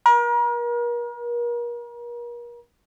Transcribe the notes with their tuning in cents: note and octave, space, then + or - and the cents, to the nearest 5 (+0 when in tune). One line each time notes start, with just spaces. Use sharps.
A#4 +40